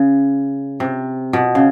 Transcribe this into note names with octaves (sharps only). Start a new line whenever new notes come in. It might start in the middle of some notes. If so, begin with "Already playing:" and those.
Already playing: C#3
C3
B2
C#3